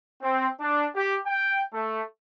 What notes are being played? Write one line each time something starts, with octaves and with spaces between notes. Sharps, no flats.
C4
D4
G4
G5
A3